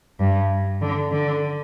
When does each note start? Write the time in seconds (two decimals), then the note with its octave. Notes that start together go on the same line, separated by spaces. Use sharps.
0.20 G2
0.81 D3
1.12 D3